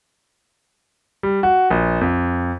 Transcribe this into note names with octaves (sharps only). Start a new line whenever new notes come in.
G3
F#4
A#1
F2